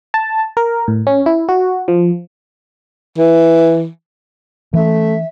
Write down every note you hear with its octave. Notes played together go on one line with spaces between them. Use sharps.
A5
A#4
A2
C#4
E4
F#4
F3
E3
E3 A3 C#4 E5